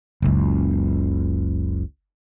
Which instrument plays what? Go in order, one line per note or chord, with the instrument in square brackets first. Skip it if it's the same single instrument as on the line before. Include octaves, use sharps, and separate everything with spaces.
[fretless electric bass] F#1 C#2